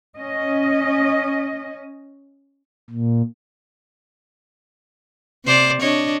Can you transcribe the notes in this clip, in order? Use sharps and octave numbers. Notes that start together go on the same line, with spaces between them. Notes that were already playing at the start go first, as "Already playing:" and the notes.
C#4 D#5
A#2
C3 C5 D5
D4 C#5 D#5